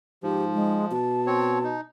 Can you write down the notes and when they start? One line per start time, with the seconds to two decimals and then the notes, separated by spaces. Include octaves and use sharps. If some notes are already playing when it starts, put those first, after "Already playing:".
0.23 G#2 F3 G4
0.54 G#3
0.92 B2 A5
1.27 C4 C#5
1.64 D#4